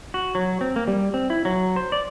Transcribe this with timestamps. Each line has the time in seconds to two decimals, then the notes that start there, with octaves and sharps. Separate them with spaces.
0.14 F#4
0.35 F#3
0.61 C4
0.76 A#3
0.88 G3
1.14 C4
1.30 E4
1.45 F#3
1.76 C5
1.92 D5